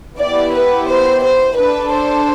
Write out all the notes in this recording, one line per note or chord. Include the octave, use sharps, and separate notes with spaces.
B3 E4 G4 D5
B4
C5
C5
D4 A4 B4
C5